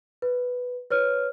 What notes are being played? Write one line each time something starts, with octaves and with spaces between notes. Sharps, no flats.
B4
B4 C#5 F6